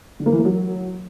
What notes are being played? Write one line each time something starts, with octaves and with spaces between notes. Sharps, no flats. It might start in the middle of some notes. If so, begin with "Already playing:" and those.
D3
A#3
E3
A#3
F#3